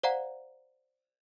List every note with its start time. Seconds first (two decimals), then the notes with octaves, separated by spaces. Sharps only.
0.03 C5 D5 F5 F#5 A#5